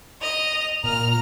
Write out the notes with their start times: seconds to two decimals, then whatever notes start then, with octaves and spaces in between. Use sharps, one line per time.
0.21 D#5 F7
0.84 A#2 A#5 F6